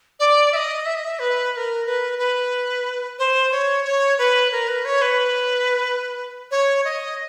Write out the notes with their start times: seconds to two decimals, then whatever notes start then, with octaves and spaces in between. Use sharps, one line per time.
0.20 D5
0.52 E5
0.56 D#5
0.86 E5
0.95 D#5
1.04 E5
1.19 B4
1.52 B4
1.57 A#4
1.86 B4
2.18 B4
3.19 C5
3.52 C#5
3.85 C#5
4.18 B4
4.52 A#4
4.68 B4
4.85 C#5
5.02 B4
6.51 C#5
6.85 D#5